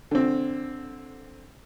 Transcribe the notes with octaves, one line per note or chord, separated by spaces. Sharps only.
D3 C4